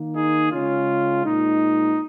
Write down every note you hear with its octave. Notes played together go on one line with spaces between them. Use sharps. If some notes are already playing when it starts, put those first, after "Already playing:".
Already playing: D#3 A#3
D#4 G#4
C#3 G#3 C#4 F4
A#2 G#3 D#4